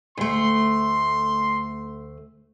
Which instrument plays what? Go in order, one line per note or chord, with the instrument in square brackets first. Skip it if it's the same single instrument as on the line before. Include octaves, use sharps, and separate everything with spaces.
[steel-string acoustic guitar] D2 A3 [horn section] C6